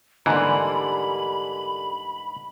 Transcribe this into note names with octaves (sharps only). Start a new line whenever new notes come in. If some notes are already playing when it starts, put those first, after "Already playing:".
G#2 D3 E3 G3 A#3 B5